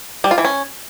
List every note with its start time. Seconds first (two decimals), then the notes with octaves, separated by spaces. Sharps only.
0.24 G3
0.31 F4
0.38 E3
0.45 C#4